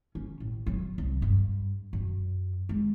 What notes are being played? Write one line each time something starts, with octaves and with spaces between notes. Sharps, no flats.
C#4
A1
F#3
C2
G2
F#2
G#3